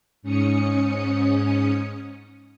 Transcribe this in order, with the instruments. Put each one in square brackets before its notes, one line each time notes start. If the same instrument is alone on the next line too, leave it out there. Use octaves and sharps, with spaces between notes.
[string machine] G#2 C#4 D#6 C#7